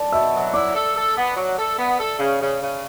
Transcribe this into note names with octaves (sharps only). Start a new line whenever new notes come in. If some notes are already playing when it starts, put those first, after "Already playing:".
Already playing: D5 A5
B2 E5 E6
F#3
E4 D5 D6
A4
A4
B3
F#3
A4
B3
A4
C#3
C#3
C#3